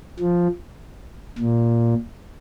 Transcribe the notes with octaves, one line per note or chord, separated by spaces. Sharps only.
F3
A#2